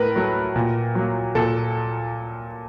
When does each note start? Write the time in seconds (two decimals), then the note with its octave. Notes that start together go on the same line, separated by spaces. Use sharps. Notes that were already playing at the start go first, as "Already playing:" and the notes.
Already playing: A2 A#4 B4
0.16 F#3 A3
0.56 A#2
0.95 F#3 A#3
1.35 A#2 A4